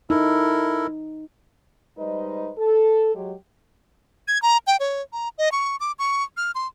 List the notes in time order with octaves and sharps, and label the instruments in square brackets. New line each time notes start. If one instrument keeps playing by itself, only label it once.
[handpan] D#4 [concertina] E4 A4 A#4
[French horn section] G3 G#3 D#4 B4 C5 D#5
A4
F#3 G#3 G4
[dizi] G#6
A#5
G5
C#5
A#5
D#5
C#6
D6
C#6
F6
C6